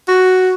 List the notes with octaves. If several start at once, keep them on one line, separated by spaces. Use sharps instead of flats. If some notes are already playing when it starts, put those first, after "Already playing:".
F#4